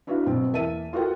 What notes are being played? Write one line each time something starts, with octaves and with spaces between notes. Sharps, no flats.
D4 E4 F#4 B4 F5
B2 F#3 C4
E2 A#3 E5 A5 D#7
F4 F#4 A4 A#4 F#5 G5